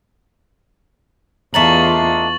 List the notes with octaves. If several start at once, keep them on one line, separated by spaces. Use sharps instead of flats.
E2 A3 D4 D#4 F4 C#6 A6 F#7